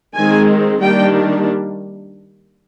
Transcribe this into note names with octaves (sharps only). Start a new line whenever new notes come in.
D#3 G#3 C4 G#5
D#3 G3 A#3 D4 G5